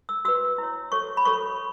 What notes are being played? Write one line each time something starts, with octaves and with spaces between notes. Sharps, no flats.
E6
F#4 B4 E6
E4 C#5
F#4 A4 C#5 C#6
B5
F#4 A4 C#5 C#6